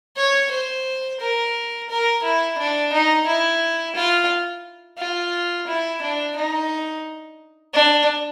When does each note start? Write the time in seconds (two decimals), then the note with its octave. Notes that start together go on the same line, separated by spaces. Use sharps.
0.17 C#5
0.51 C5
1.20 A#4
1.89 A#4
2.23 E4
2.58 D4
2.93 D#4
3.27 E4
3.95 F4
4.98 F4
5.67 E4
6.02 D4
6.36 D#4
7.74 D4